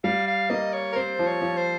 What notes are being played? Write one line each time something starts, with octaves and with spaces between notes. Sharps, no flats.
G3 F5
F5
A#3 D#5
C#5
A#4
C4 C5
F3
C#5
F3
C5